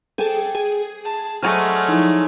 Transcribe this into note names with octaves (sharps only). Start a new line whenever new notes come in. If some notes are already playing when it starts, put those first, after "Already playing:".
G#4 A4 G5 D6
G#4
A5
F#3 G#3 A3 C#5 D5 F6
F3 D#4 E4